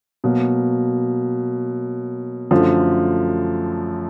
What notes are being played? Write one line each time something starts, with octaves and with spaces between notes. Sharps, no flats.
B2 F#3 A#3
F#2 D3 F3 A3